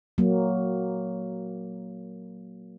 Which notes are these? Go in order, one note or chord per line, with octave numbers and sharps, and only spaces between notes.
F#3 A#3